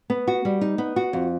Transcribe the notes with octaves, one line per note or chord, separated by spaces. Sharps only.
B3
F#4
G3
D#4
B3
F#4
F2